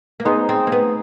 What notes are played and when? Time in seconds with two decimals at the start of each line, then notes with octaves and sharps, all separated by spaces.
0.20 A#3
0.25 B3 D#4 G#4 C5
0.49 C4
0.67 A#3
0.72 B3